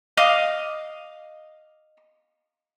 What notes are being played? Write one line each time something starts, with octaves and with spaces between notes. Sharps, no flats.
D#5 F5 D6